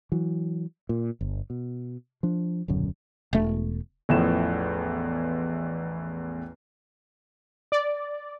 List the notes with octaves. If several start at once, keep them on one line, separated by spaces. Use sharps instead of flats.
E3 F#3
A#2
G1
B2
F3 D4
D#1 B1 F#2 D3
E1 A3
A1 E2 A2 F3 E7
D5